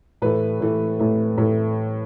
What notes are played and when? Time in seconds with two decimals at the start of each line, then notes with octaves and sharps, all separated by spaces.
0.22 A2 E3 A3 B4
0.60 A2 E3 A3
0.99 A2 E3 A3
1.38 A2 E3 A3